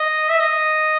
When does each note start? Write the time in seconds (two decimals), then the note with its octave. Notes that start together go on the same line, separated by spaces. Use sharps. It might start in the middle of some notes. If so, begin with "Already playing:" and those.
Already playing: D#5
0.29 E5
0.40 D#5